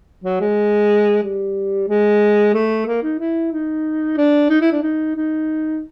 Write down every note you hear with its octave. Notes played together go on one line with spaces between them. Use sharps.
F#3
G#3
G3
G#3
A3
A#3
D#4
E4
D#4
D4
D#4
E4
D4
D#4
D#4